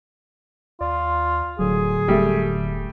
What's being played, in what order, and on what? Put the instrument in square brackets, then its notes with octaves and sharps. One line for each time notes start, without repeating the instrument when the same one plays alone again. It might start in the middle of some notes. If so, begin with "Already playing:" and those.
[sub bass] D#2 [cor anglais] F4 [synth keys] D5
[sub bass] D#1 [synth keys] A2 D3 F#3 [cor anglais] G#4
[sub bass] E1 [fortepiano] G3 A3